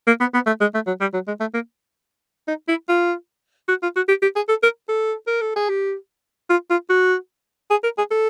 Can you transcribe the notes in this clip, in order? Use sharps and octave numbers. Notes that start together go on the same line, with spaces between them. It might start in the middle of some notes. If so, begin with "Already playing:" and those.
A#3
B3
B3
A3
G#3
A3
F#3
G3
F#3
G#3
A3
A#3
D#4
E4
F4
F#4
F4
F#4
G4
G4
G#4
A4
A#4
A4
A#4
A4
G#4
G4
F4
F4
F#4
G#4
A#4
G#4
A4